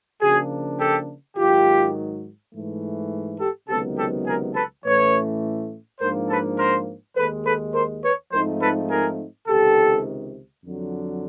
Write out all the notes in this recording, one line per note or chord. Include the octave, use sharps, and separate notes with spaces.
C#3 F3 A#3 D4 F#4 G#4
G4 A4
G#2 D#3 F#3 F4 G4
G#2 E3 A3
G4 A4
C#2 C3 D#3 F#3 B3 G4 A4
G4 A4
G#4 A#4
A4 B4
A2 E3 A3 C#4 B4 C#5
G#2 F3 A#3 D4 A#4 C5
A4 B4
A#4 C5
D#2 D#3 G#3 A4 B4
A4 B4
A#4 C5
B4 C#5
G#2 F3 A3 C4 D#4 A#4 C5
A4 B4
G#4 A#4
C#2 C3 D#3 G4 A4
F2 D3 F#3